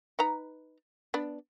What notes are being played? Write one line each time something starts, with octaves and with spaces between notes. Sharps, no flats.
D#4 B4 A#5
B3 D4